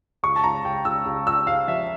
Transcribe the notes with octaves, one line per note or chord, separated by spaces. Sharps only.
C#2 C#6
A5
C#2 A#5
C#2 G5
C#2 E6
C#2
C#2 E6
C#2 F5
F3 E5